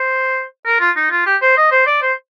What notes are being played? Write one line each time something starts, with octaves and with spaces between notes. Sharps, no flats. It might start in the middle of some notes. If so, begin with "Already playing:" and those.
Already playing: C5
A#4
F4
D#4
F4
G4
C5
D#5
C5
D5
C5